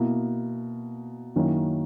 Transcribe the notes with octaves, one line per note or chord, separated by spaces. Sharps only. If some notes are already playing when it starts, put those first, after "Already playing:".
Already playing: B2 A#3 E4
F#2 D#3 A#3 C#4 E4